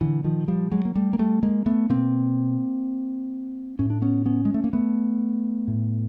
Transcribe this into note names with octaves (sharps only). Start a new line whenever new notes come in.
A#2 D3 E3
D#3 F3
F3 G3
F#3 G#3
A#3
G3 A3
A#3
G3 A3
G#3 A#3
A3 B3
B2 A#3 C4
A2 C#4
D4
B3 C#4
B3 C#4
G#3
A3
A#3
A3 B3
A2